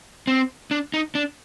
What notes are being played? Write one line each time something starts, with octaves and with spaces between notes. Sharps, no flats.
C4
D4
D#4
D4